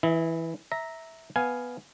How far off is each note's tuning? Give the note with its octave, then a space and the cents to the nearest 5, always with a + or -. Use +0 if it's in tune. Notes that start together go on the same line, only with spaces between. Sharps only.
E3 -5 E4 +0 D#5 +45
E5 -15 A#5 +0
B3 +0 F5 +0 G#5 +5